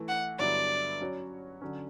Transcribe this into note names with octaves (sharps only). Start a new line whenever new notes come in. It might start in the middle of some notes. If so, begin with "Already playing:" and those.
Already playing: E3 A3 E4
F#5
G2 D3 F#3 B3 E4 D5
F#3 C#4 F#4 C#5
D3 F#3 C#4